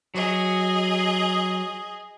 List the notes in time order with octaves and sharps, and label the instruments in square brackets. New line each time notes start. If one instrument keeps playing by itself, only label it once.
[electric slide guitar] F#3 [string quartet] G#4 D#5